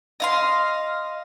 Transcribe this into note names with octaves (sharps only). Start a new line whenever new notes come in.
D#5 F5 C6